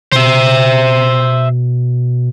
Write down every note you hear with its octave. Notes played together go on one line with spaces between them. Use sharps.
B2 C5 E5